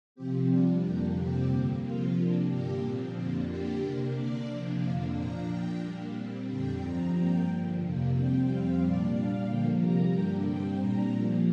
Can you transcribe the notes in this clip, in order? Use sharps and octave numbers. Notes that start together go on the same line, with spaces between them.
C3 F3 C4 G4
C3 G3 D4 F4
F2 D3 A#3 D4 G4
F2 C3 G3 C4 G4
G2 D3 A#3
C3 F3 A#3 F4
C3 A#3 D4
G2 D3 A#3 D4 G4
A#2 F3 C4
F2 D3 A#3 D4 F4
D3 A#3 D4 G4
C3 A#3 D4 A#4
D3 A#3 D4 D5
C3 F3 A#3 D4
F2 D3 A#3 D4 F5
A#2 F3 D4 A#5
A#2 A#3 D4 G5
A#2 G3 A#3 D4
A#2 G3 C4
F2 D3 G3 D4 G5
G2 F3 C4 A#5
G2 G3 A#3 G5
G2 D3 F3
F2 C3 A#3 D4
C3 G3 C4 G5
F2 C3 G3 C4 F5
A#2 G3 A#3 D4 D5
A#2 G3 D4 F5
D3 F3 A#3 G5
C3 G3 A#3 A#5
G2 D3 A#3 D4 G5
G2 G3 C4 G5
A#2 G3 D4 A#5
A#2 F3 A#3